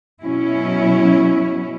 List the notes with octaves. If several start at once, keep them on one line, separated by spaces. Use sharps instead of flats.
B2 F#3 C#4 E4